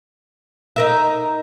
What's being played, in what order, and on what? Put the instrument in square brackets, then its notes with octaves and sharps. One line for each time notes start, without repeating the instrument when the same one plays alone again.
[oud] D#4 A#4 E5